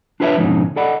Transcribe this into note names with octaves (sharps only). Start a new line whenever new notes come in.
D4 F4 B4 C#5 D5 E5
F2 G#2 B2 D3 C#4 D#4
A4 D5 D#5 F#5 B5